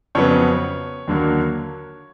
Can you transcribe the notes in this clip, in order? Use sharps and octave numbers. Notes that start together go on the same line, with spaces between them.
F2 C#3 F#3 B3 C#5
D#2 D3 F#3 A#3